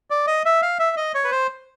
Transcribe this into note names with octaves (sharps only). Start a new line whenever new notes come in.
D5
D#5
E5
F5
E5
D#5
C#5
B4
C5